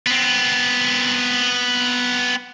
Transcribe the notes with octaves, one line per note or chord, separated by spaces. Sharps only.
B3 C4